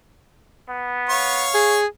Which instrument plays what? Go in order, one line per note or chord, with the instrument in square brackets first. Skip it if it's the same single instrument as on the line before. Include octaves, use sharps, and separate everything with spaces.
[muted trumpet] B3
[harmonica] C#5 F5 C#6
[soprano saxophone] G#4